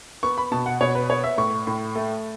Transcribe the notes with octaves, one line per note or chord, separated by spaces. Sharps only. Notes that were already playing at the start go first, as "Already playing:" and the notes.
B3 C#6
B5
B2 A5
F#5
B2 C#5
B4
B3 C#5
E5
A2 C#6
A2
A3